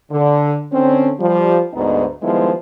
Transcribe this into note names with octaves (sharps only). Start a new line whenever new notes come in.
D3
D3 C4 C#4
F3 G3
D2 G#2 B3 D#4
D#3 F3 G3 G#3 B3 E4